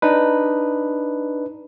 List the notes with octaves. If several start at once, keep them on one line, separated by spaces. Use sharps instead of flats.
D4 D#4 B4